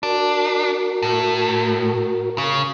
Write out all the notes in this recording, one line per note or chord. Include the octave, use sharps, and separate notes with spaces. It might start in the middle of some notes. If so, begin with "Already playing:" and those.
D4 F#4 A#4
A2
C#3